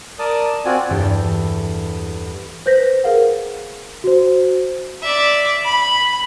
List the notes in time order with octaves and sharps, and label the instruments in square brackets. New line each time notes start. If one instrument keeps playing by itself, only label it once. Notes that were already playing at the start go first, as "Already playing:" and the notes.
[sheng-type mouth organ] A#4 D5 A5 D#6
C4 F4 F#4 D5 G#5
[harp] E2 G2 E3 A4 G5
[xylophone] B4 C5 G6 A#6 B6
G#4 A#4 F5 F#5
[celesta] F#4 C5
[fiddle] D5 E5
B5